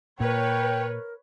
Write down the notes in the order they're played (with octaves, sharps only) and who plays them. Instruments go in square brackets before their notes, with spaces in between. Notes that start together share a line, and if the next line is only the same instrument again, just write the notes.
[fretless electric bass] A#2 [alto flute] A#4 [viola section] B4 C#5 [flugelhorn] G5